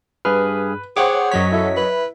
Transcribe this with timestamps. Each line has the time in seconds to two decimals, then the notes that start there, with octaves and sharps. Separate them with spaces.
0.25 G2 G#4 B4 F6
0.97 G#4 C5 C#5 F#5 G5 D6
1.31 F#2 F#3 C#5 D#5 B6
1.52 E4 A4
1.76 B4